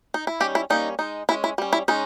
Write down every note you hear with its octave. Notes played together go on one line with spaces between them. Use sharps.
D#4
E4
D#3 G3 C#4 G4
E4
G3 A#3 C#4 D#4
G#3 D#4
G#3 C#4 E4
E4
G3 C#4
E4
G#3 C#4 D#4